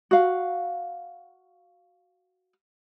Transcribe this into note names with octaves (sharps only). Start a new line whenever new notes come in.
F#4 F5